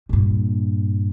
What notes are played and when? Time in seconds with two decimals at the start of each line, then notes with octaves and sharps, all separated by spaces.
0.09 G2 A#2